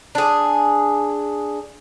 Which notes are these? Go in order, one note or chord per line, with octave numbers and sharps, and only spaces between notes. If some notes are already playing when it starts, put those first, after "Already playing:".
D4 G#4